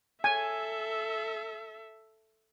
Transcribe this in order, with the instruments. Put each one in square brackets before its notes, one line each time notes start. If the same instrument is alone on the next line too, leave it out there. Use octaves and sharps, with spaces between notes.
[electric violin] A4 E5 [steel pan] G#5